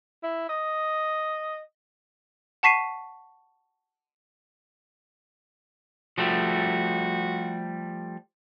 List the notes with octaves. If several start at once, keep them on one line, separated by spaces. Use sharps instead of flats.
E4
D#5
F#5 A5 C#6 B6 C7 D#7
F3 G3 A3 F#4